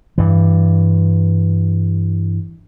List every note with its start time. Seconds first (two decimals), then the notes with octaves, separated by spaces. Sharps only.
0.18 G2 E3